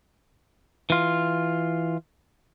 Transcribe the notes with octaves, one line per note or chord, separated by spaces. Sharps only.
E3 F4